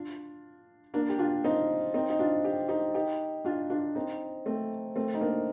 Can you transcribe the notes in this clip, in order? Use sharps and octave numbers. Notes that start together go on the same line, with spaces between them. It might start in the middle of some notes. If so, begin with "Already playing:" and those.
Already playing: D4 F4
A#3 D4
G4
D4 F4
C4 D#4
C4 D#4
D#4
D4 F4
G4
D#4 G4
D#4 G4
D4 F4
D4 F4
C4 D#4
A3 C4
A3 C4
D#4
A#3 D4